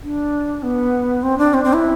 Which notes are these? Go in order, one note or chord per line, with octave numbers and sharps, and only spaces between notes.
D4
B3
C4
D4
C4
C4
E4